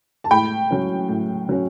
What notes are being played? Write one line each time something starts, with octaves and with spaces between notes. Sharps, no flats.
A5
A2 G5 B5
F#3 C#4
A2
F#3 C#4